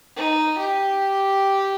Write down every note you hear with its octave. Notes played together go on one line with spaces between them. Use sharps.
D#4
G4